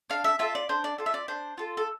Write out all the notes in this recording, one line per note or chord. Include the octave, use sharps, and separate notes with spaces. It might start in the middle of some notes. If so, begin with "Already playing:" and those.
D4 F5
E5
F4 A4 E5
D5
D4 C5
D5
F4 A4
E5
D5
D4 C5
F4 A4
A4